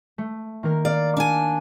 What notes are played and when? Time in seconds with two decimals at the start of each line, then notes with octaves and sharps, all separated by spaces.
0.18 A3
0.63 D#3 A#3 A#4
0.85 D5 F5
1.17 D4 G#5